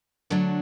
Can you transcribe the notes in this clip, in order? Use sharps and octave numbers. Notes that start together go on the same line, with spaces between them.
D3 F#3 A3 D4 F#4